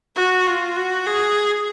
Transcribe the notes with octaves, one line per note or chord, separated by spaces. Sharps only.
F#4
F4
F#4
G#4